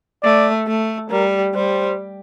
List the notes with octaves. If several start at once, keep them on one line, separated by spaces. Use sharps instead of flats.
A3 D5
A3
G3 A#4
G3 C5